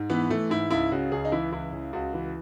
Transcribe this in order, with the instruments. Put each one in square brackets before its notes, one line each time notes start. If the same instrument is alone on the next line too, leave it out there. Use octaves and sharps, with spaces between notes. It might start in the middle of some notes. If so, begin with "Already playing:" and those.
Already playing: [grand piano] G#2
E3 B3
E3 A3
G#2 E4
C#2 E4
C#3 F#4
C#2 G#4
D#4
E3 E4
C#2 E4
C#3
C#2 F#4
E3